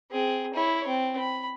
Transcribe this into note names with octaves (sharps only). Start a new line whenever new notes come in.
C4 G#4
E4 C#5
C4
B5